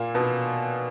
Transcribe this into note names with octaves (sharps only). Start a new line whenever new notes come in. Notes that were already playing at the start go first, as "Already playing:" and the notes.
Already playing: A#2 A#3
B2 B3